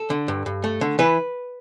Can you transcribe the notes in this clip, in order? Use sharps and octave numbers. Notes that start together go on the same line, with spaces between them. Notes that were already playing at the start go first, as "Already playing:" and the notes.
Already playing: A4
D3
G2
G2
A3
D3
E3 B4